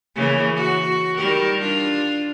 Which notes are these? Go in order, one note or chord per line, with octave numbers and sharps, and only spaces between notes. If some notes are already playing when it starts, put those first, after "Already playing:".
C#3 E3 A#3
F#4
D#3 G3 A#4
D4 F4